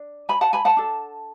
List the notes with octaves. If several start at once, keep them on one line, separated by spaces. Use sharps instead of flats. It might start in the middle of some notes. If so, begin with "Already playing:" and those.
Already playing: D4
G#5 B5
F#5 A5
G#5 B5
F#5 A5
D4 A4